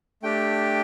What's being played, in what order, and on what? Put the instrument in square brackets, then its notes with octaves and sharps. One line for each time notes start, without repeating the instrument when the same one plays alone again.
[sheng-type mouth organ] A3 D4 G4 G5